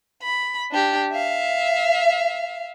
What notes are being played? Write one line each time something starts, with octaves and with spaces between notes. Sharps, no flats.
B5
D4 G4
E5 F5